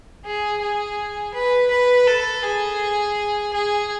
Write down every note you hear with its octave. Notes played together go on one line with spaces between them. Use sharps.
G#4
G#4
B4
B4
A4
G#4
G#4